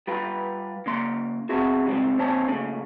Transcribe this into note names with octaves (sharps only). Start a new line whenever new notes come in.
G3 F4 G4 B4
C#3 A#3 C6
B3 C4 E4 F#4 G#4
C#3 E3 G3 G#3 C4
D#2 C4 C#4 C5 A5
A#2 C#3 A3